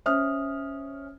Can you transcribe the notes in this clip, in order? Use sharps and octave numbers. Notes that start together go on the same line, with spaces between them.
C#4 C5 E5 D#6 F6